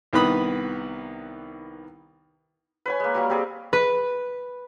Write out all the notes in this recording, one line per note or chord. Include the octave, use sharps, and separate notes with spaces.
C2 D#3 B3 B4 B5 D#6
B4 C#5 G#5
G#3 A#3
F#3 G3 A#3
C4 G4 G#4 D5
B4